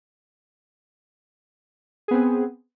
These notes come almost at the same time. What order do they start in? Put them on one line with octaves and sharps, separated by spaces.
G#4 B3 C4